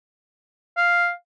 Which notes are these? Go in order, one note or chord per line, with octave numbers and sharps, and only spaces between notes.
F5